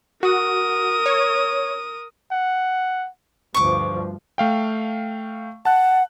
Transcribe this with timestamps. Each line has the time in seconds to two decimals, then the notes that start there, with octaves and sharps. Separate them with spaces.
0.23 F#4 A#4 D#6
1.06 C#5
2.31 F#5
3.54 D2 G2 F3 C#6 D6
4.38 A3 F5 G5
5.65 F#5 A5 F#6